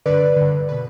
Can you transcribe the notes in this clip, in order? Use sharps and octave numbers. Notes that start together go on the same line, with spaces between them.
G2 D3 B4 D5
G2 D3
B2 B4